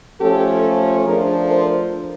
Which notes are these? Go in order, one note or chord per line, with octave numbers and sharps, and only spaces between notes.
F3 A3 C#4 G4 A4
F3 A3 D4 G#4 A#4
A#4 C5